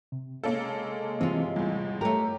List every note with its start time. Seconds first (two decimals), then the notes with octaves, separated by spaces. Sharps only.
0.12 C3
0.43 G#3 A#3 C#4 A4
1.21 C3 E3 C4 F4
1.56 E2 A2 F3 G3
2.01 A3 G4 A4 A#4 C#5